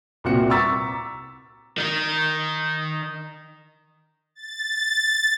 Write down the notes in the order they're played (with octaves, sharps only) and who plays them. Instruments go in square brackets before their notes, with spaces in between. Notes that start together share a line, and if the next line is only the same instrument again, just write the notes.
[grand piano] C2 A#2 C4 F#4 C#7
A#5 C#6 D6 E6 A6 B6
[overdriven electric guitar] D#3 D#4
[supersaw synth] A6